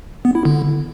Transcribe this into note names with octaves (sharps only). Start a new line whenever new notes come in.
B3
E4
D3